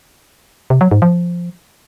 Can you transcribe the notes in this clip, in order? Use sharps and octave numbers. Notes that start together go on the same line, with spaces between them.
C3
F#3
G#2
F3